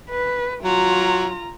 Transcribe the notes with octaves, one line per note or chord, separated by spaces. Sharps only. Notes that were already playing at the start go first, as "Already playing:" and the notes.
B4
F#3 F4 A#5